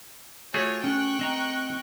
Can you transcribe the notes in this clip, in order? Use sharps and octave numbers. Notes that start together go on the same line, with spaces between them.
A3 F4 F#4 G#4 C#5
C#4 G5 C#6 F#6
C4 D#5 A#5